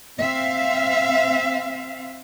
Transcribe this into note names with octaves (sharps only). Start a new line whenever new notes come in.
C4 E5 F5